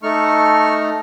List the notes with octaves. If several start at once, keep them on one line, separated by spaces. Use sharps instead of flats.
A3 D#4 A4 C#6 F6